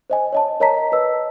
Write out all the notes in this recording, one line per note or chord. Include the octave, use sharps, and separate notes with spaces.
C5 D#5 G#5
C#5 D#5 A5
A#4 C#5 D#5 A5 A#5 B6
B4 D#5 E6